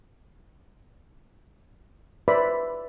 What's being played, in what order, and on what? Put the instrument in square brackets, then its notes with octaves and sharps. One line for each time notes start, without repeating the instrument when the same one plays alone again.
[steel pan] B4 C5 D5 E5 B5